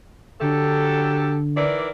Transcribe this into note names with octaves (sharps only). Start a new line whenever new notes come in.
D3 F#3 G4 A4
D#3 E3 D5